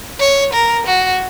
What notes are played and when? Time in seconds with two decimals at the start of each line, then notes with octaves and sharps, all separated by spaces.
0.20 C#5
0.53 A#4
0.86 F#4